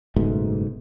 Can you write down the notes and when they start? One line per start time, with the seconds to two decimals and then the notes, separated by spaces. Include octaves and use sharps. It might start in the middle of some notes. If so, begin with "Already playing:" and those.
0.16 F#1 G#2 B2 A3